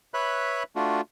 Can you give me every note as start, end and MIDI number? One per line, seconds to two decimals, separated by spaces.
0.14 0.63 71
0.14 0.63 73
0.14 0.63 76
0.14 0.63 83
0.14 0.63 90
0.76 1.01 57
0.76 1.01 62
0.76 1.01 65
0.76 1.01 66